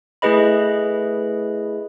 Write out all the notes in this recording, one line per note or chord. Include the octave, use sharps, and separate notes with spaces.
A3 E4 G#4 B4 D#5 B5